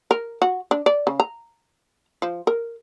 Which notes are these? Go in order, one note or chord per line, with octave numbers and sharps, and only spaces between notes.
A#4
F#4
D4
D5
C#3
A#5
F3
A#4